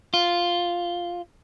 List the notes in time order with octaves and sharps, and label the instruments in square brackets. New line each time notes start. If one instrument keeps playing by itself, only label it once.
[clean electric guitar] F4